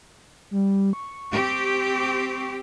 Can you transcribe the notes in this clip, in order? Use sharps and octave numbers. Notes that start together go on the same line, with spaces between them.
G3
C#6
C4 G4